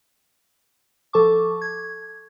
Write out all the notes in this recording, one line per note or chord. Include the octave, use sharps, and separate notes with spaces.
F3 A4 A5 C#6 D6
G#6